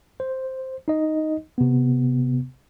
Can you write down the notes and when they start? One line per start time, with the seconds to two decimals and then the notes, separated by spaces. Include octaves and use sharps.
0.20 C5
0.88 D#4 D#5
1.58 C3 B3